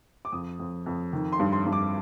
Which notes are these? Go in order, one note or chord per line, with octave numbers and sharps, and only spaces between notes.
D6
F2 D#6
F2
F2
D#3
C6
G2
C6
G2
D6